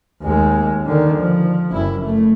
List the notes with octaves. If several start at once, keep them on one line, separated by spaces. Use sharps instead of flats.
D#2 G#3
D3 D#3
F3
F#1 E4
A3